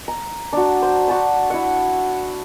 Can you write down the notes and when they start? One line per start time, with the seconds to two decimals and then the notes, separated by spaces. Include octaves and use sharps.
0.08 A#5
0.53 D4 F#4
0.82 C5
1.08 F#4 A5 B5
1.50 E4 F#5